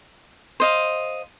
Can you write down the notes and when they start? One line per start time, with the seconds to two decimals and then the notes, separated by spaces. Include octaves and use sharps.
0.60 C5 D#5 F5